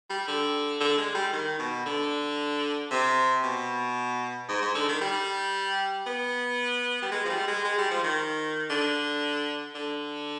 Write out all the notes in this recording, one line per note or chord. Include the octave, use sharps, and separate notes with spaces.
G3
D3
D3
G#3
G3
D#3
B2
D3
C3
B2
G#2
G#2
D3
D#3
G3
B3
G3
G#3
F3
G3
G#3
G#3
G3
F3
D#3
D3
D3